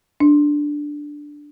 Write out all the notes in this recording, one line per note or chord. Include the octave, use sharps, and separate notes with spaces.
D4